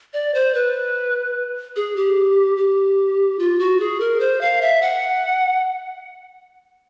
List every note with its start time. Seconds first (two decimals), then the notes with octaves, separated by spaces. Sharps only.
0.13 D5
0.34 C5
0.55 B4
1.76 G#4
1.96 G4
2.57 G4
3.39 F4
3.59 F#4
3.80 G#4
4.00 A#4
4.20 C5
4.41 F5
4.61 E5
4.82 F#5